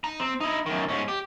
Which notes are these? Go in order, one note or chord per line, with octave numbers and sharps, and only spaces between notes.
D#4 A#5
C4
D#4 E4
F#2 D#3
G#2 C#4
G4